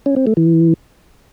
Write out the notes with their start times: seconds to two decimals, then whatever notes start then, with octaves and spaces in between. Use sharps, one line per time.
0.06 C#4
0.16 C4
0.27 A3
0.37 E3